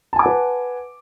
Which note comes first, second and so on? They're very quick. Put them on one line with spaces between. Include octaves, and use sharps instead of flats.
A5 G#5 D6 F#5 B4